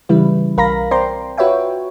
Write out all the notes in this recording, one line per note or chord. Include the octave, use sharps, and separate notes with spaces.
C#3 E3 G3 E4 B4
B1 A#4 F5 A#5 B5 A#6
C4 C5 D5 G5 A#5 C6
F4 F#4 B4 C#5 E5 G5